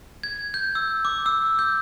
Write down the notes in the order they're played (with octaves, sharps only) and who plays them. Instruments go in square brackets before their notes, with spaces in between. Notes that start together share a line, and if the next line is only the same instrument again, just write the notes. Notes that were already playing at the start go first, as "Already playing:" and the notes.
[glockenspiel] G#6
G6
E6
D6
E6
G6